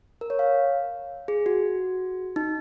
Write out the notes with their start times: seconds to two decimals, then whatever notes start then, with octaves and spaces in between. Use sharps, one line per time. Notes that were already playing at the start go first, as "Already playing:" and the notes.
0.21 A#4
0.30 C#5
0.39 F5
1.28 G#4
1.46 F#4
2.36 D#4